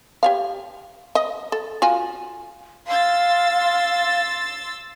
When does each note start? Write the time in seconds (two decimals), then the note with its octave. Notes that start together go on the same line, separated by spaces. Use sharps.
0.23 G4 C#5 F5
1.15 D#5
1.52 A4
1.82 F4 F#4 G#5
2.87 F5 C6 E6 A6